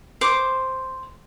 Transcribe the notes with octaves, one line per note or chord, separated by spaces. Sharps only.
C5 D6